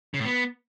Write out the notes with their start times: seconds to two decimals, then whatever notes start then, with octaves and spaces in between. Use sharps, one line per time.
0.14 C#3
0.20 A2
0.25 B3